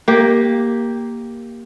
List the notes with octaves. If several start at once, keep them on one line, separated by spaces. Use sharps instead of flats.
A#3 G4